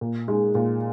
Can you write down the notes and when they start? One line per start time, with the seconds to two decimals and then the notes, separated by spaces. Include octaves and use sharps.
0.01 A#2
0.28 G#3 D#4 G#4
0.55 A#2